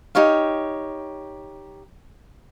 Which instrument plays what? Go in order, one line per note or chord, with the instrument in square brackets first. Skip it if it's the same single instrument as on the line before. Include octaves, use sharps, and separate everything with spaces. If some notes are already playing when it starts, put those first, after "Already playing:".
[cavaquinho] D#4 G4 C#5 F5